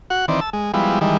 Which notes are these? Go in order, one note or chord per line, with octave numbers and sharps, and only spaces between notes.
F#4 F#5
D#3 E3 C4 D5
A5 E6
G#3
F3 G3 G#3 B3 E4
D#3 E3 G3 G#3